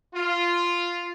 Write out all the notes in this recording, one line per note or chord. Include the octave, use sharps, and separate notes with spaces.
F4